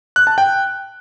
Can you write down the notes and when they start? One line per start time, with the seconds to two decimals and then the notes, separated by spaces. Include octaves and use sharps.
0.16 F#6
0.27 A5
0.38 G5